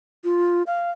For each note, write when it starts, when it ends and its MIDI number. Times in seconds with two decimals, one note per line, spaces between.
0.24 0.63 65
0.67 0.91 77